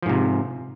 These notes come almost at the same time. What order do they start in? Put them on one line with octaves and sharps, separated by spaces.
F3 G#2 C3